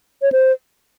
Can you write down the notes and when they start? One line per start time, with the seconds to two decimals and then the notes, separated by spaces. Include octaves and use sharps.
0.22 C#5
0.32 C5